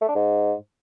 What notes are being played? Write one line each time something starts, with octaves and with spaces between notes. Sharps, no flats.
A3
D4
G#2